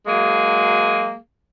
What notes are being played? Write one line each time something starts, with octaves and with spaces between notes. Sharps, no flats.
F#3 G#3 A#3 G#4